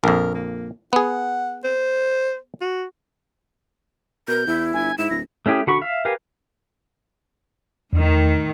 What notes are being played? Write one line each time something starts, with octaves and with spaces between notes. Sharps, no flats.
A#1 F2 A#4
A#3
B3 G#4 F#5
C5
F#4
B2 A#4 G6
E2 E4
G1 G#5
G#2 E4 E7
D1 A#6
A3 C#4 E4 G4 G#4
D3 F#4 B5 C#6
E5 F5
G4 A#4 B4 F5 G#5
E2 A2 D#3